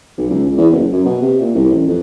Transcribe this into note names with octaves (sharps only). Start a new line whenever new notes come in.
B1
C#2
C#2
E2
F#1
F#2
B2
C3
A#2
C2
A1
F2